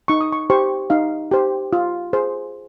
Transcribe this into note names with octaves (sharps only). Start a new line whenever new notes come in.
D#4 C#6
D#6
C#6
G4 C5 C#6
D#4 F5
G4 C5
F4
G#4 C5